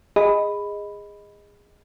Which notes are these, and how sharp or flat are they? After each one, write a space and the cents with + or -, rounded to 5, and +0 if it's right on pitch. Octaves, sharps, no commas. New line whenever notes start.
G#4 -20 D#5 +0 B5 +5